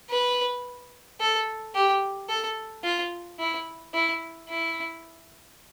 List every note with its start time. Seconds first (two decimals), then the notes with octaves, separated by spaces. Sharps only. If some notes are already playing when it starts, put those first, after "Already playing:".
0.10 B4
1.20 A4
1.75 G4
2.29 A4
2.84 F4
3.39 E4
3.94 E4
4.49 E4